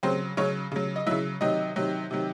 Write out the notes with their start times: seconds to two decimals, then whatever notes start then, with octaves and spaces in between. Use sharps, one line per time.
0.03 C#3 F#3 C4 C5
0.37 C#3 F#3 C#4 C#5
0.72 C#3 F#3
0.96 D#5
1.07 C#3 F#3 E4 E5
1.41 C3 D#3 F#3 D#4 D#5
1.76 C3 D#3 F#3
2.11 C3 D#3 F#3